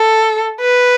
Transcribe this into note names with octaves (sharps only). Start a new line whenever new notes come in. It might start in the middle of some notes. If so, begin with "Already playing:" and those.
Already playing: A4
B4